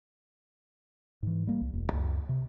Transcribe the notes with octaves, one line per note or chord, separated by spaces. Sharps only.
G#2 E3
G3 A#3
C2
E1
C#2 F#2
C3